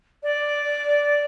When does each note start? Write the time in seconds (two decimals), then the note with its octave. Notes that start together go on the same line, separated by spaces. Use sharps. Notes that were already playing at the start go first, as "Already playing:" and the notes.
0.23 D5